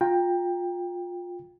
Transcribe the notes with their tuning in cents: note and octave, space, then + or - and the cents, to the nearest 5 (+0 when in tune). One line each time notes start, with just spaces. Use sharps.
F4 +20 G5 +15 A#5 +0